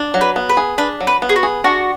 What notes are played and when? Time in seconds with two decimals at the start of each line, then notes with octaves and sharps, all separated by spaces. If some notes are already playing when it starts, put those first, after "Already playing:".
Already playing: D4
0.14 F#3
0.21 B4
0.36 B3
0.49 B4
0.57 G#4
0.78 D4 B4
1.01 F#3
1.07 B4
1.22 B3
1.29 G#4
1.36 F#4
1.43 G#4
1.64 D4 F#4